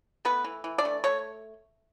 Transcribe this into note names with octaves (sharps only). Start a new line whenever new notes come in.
A3 B3 B4
E3
E3
D4 D5
A3
A3 C#5